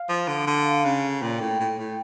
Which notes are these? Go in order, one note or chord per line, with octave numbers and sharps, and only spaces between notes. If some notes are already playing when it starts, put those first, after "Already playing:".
Already playing: F5
F3
D3
D3
C#3
A#2 G5
A2
A2
A2